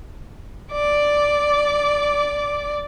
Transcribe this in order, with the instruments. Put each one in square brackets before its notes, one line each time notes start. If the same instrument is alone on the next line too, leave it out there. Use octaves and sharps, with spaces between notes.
[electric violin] D5 D6